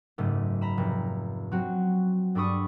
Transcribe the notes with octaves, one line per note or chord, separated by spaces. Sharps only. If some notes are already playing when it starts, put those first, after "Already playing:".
F#1 G#2 A3
A#5 B5 E7
F1
F#3 C4 F#4
G2 D4 A4 B5 C#6 D#6